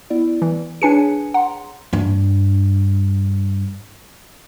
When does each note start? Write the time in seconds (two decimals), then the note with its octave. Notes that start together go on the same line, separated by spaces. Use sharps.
0.10 B3 E4 D5
0.42 E3
0.82 D4 G#4 B4 C#5 G#5 C#7
1.34 F#5 A#5 C6
1.93 G2 D4